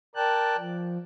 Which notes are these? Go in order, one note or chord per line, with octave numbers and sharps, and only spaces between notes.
A#4 D5 G5 A5 F#6
F3